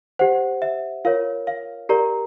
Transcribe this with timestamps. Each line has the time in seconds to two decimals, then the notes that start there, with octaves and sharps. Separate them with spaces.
0.19 G4 C5 F#5
0.62 E5
1.05 F4 A#4 C#5 F5
1.47 F5
1.89 G4 A#4 D5 A#5